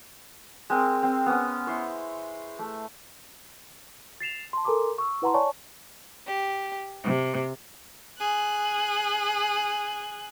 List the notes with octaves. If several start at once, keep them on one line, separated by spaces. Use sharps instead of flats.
G#3 C4 A#4
C4
B3 C#4
E4 C5 C#5
A3
A6 C7 E7 F7
A5 C6
A4 A#4 G#5 A#5 C6 D6
C#6 E6
E4 B4 F#5 A5 A#5 C6
C#5 D5 G#5 A5 C#6
G4
C3
G#4 F#6